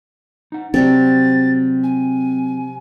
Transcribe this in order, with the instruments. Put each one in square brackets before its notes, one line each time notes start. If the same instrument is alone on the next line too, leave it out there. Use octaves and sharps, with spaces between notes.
[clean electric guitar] D#4 F#5
[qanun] C3 G3 A4 [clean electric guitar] F#3 F#4 [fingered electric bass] C4 [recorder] A6
[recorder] G#5